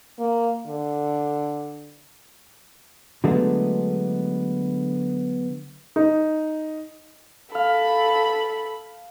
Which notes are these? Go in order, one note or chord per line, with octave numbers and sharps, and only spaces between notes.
A#3
D3
D3 F#3 G#3 A3 B3
D#4
A4 F5 B5